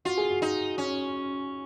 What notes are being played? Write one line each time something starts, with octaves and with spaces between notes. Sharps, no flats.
F4 F#4
G#4
F#4
D#4
C#4